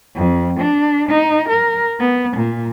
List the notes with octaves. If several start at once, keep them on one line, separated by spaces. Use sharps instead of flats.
F2
D4
D#4
A#4
B3
A#2